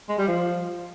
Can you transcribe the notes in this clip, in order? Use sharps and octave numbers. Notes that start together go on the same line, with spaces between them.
G#3
G3
F3